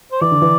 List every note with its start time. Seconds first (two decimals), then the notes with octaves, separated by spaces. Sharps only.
0.12 C5
0.21 E3 D5
0.31 D3
0.42 E3